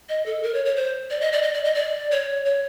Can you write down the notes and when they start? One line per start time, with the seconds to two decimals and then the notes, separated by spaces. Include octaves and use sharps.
0.09 D#5
0.26 A4
0.43 A#4
0.54 C#5
0.65 C#5
0.76 C5
1.10 D5
1.21 D#5
1.32 D5
1.42 D#5
1.54 D5
1.64 D#5
1.75 D5
2.11 C#5
2.45 C#5